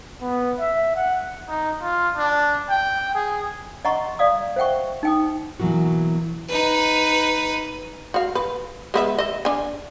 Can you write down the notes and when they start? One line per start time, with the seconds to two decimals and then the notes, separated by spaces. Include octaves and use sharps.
0.22 B3
0.59 E5
0.96 F#5
1.49 D#4
1.82 F4
2.17 D4
2.69 G5
3.15 G#4
3.85 D#5 F#5 A#5 C6 C#6
4.19 D5 F5 D#6
4.56 C5 E5 F#5 G5 C#6
5.03 D#4 G5 D#6
5.60 B2 E3 F#3 A#3 F#4
6.48 D#4 B4
8.14 F#4 F5
8.35 B4
8.94 G#3 B3 E5
9.19 D#5 E5
9.45 D4 G#5